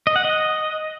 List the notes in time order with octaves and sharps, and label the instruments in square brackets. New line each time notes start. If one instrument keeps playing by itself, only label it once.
[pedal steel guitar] D#5
F#5
D#5